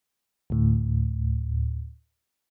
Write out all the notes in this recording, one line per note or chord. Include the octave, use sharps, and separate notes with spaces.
D2 A2